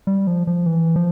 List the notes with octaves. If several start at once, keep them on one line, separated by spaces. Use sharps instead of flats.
G3
F3
F3
E3
F3